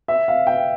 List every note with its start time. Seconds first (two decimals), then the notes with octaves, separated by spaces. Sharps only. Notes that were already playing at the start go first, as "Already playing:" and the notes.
0.08 E5
0.28 F5
0.47 G5